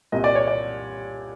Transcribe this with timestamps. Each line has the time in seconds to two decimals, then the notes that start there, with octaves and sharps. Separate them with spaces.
0.12 C2 A#2 D#5
0.24 D5
0.35 C#5
0.48 D5